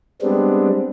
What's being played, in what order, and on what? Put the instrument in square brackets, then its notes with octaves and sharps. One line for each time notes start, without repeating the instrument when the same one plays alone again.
[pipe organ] G3 G#3 B3 C4 D4